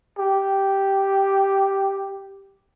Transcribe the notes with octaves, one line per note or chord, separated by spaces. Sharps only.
G4